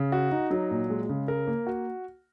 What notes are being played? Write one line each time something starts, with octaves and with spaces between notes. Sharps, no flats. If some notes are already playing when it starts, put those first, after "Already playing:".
Already playing: C#3
F#4
D#4
F#3
A#2
G#3
C#3
A#4
A#3
F#4